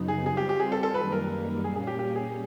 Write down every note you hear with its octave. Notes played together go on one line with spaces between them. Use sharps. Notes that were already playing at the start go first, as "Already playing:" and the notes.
Already playing: F#2 C#3 F#3 B3 D#4
G#4
G3 C4 F4 G#4
G4
G4
G#4
A4
A4
F#2 D#3 G3 A#3 B4
A#4
A#2 G3 A#3 C#4 G#4
G#4
G4
G4
G#4